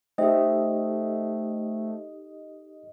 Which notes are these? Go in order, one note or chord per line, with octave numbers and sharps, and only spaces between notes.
A3 D#4 G4 A4 C5 D#5 E5 G5